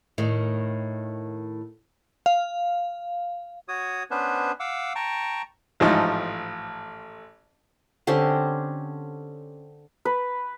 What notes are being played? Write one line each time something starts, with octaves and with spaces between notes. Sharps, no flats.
A2 D#3
F5
F#4 C#5 D#6
B3 C#4 D4 B4 C5
F5 F#5 D6 E6
G5 A5 A#5 C#6
A1 G#2 F3 A3 D#4 A5
D3 C4 C#4 G4
B4